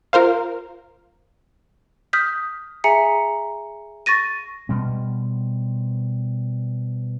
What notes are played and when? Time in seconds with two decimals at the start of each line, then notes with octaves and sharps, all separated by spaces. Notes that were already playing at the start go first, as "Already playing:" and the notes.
0.13 F4 A#4 C5 F5
2.13 D#6 F6 G6 B6
2.84 G#4 E5 G#5 A#5 C#7
4.06 C#6 A6 A#6 D#7
4.69 B2 G3 C4